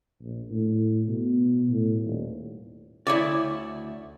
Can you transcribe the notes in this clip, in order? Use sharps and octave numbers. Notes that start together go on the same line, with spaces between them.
A#1
A2
B2
A2
D#1
D2 E4 C#5 D5